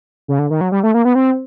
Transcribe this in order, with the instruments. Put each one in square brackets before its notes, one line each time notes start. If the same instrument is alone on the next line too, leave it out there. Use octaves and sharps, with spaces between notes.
[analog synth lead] C#3
D3
D#3
F#3
G3
A3
A#3
B3
C4